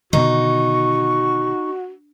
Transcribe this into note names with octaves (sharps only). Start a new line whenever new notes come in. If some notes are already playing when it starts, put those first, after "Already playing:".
B2 D3 D#3 D#4 F#4 C#6